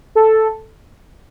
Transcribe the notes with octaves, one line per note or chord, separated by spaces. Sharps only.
A4